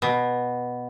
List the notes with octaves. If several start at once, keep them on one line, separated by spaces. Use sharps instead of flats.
B2